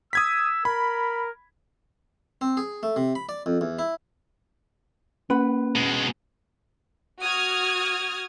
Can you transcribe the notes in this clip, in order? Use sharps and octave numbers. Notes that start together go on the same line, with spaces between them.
D#6 E6 G#6 B6
A#4 B5
C4
G#4
A3
C3
B5
D5
F2
E2
E4
A#3 C#4 B4 F#5 B5
B2 G#3
F#4 D#6 F6 G#6